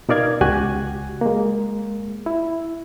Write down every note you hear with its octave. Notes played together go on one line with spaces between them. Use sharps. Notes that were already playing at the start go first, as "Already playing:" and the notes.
B2 D#4 A#4 D5 F5 G#6
C#2 F#4 G4 G#5 F#6 G#6
G#3 A#3
E4